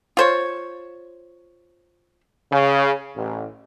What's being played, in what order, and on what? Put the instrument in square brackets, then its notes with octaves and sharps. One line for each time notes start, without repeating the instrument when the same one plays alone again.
[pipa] F4 C5 C#5
[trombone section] C#3
A1